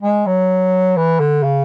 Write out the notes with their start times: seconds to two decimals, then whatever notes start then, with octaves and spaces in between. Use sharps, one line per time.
0.02 G#3
0.26 F#3
0.97 E3
1.20 D3
1.43 C#3